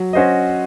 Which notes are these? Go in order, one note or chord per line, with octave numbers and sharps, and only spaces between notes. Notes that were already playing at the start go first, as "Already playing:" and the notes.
Already playing: F#3
C#4 F#4 C5 D#5